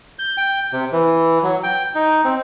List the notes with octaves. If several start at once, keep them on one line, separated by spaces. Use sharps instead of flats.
G6
G5
C3
E3
F#3
G5
D#4
C4